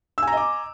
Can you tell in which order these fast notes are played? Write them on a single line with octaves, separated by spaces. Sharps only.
E6 G#5 A#5 D#5 D6